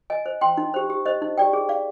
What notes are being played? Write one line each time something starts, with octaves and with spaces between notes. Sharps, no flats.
D#5 G#5
C5
G5 C6
D#4
G4 C5
G4
C5 D#5
D#4
G4 D5 G5
G#4
D5 F5